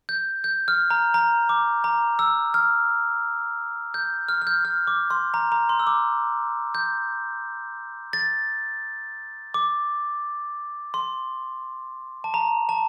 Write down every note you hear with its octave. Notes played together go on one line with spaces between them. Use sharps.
G6
G6
F6
A#5
A#5
D6
A#5
E6
F6
G6
F6
F6
G6
F6
D6
C6
A#5
A#5
C6
E6
D6
G6
A6
D6
C6
A5
A#5
A5